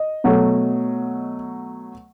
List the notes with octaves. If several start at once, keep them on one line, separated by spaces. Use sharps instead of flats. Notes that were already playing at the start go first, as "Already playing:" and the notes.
Already playing: D#5
B2 F#3 A3